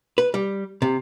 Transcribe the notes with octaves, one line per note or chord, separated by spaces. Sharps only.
B4
G3
C3